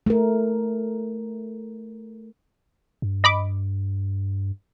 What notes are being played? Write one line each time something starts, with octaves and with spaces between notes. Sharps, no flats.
A3 A#4
G2
D#5 B5 D6